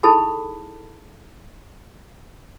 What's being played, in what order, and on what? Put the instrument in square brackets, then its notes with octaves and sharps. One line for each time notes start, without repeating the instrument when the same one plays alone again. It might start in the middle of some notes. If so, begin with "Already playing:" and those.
[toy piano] D#4 E4 G#4 A4 A5 B5